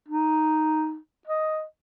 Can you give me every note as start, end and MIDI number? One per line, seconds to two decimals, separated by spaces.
0.08 0.97 63
1.27 1.63 75